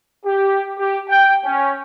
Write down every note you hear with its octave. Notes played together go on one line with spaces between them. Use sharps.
G4
G4
G5
C#4